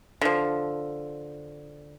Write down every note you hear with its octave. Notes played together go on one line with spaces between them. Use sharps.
D3 F3